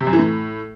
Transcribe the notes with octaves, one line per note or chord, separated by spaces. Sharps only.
C3
F#2
E3
A2